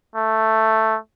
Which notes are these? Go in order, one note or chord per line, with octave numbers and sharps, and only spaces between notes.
A3